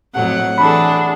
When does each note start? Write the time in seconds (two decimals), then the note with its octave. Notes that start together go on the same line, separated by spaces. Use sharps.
0.15 F2 A2 F#3 F#5
0.58 E3 D4 G#4 A4 B5